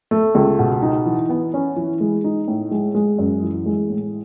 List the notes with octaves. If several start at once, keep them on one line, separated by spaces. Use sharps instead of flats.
A3
C#2
B2
D#4
E3
B3
C#4
E3
G#3
D#4
A2
G#3
G#3
F#2
E3
G#3
A2